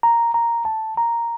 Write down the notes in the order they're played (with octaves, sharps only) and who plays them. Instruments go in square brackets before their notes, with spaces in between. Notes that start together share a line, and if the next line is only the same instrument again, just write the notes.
[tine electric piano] A#5
A#5
A5
A#5